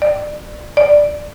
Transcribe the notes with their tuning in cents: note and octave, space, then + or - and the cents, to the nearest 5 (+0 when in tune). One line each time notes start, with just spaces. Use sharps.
D5 +25
D5 +5